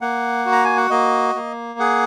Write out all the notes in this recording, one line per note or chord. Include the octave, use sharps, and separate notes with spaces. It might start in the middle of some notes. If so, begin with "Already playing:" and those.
A#3 F#5
F#4
A#5
G#5
F#5
A#3 D#5
A#3
G#4 F#5